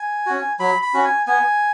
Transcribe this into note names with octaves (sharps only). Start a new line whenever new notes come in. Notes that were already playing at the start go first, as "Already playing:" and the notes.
Already playing: G#5
C#4 F#4
F#3 B5
B5
C#4 F#4
G#5
B3 G#5